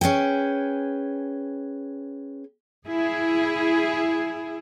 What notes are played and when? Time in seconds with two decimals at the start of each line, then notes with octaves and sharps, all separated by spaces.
0.01 C#4 G#4 B4 G5
2.87 E4 G#4